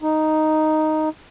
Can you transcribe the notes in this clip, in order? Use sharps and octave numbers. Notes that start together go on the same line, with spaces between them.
D#4